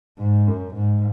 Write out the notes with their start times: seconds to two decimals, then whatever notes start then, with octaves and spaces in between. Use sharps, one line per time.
0.18 G#2
0.47 F#2
0.74 G#2